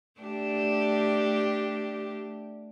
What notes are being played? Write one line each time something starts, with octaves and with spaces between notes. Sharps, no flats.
A3 D4 G4